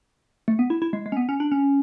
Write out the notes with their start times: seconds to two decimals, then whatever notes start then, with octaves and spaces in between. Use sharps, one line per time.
0.48 A3
0.59 B3
0.70 E4
0.82 E4
0.93 G#3
1.06 G#3
1.12 C#4
1.17 B3
1.29 C#4
1.40 D4
1.52 C#4